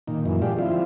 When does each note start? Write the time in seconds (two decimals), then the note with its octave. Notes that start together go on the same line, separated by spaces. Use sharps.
0.07 A#2 D#3
0.25 F#2 A#2 E3
0.42 G#3 D4 F4 G4
0.59 D3 F3 C4 E4 F4